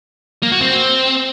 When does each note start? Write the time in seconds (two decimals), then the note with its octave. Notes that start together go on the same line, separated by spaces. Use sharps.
0.43 A#3
0.52 F#4
0.61 C4